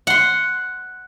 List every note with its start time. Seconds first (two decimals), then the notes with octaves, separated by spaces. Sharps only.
0.07 F#5 C6